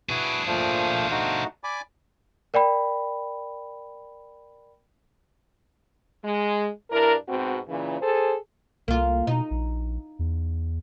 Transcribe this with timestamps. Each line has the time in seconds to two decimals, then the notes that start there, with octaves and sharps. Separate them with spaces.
0.09 D4 E4 F#4 G#4 B4
0.47 A#2 F3 A3 C5 F5
1.10 A3 D#4 F#4
1.64 D5 G#5 B5 D6
2.54 A#4 D5 G5 B5
6.25 G#3
6.91 G2 D4 E4 A#4
7.29 G#2 B2 C4 F#4
7.69 A#2 C#3 E3
8.01 G#4 A4 C5
8.88 C2 A#3 F4
9.27 B2 D#4
9.51 A#1
10.19 E2